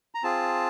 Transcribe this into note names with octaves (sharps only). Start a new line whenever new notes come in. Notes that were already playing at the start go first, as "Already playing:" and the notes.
A#5
C4 F4 G#4 A5